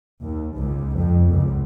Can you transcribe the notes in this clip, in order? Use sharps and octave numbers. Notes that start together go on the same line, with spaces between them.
D#2
C#2
F2
C#2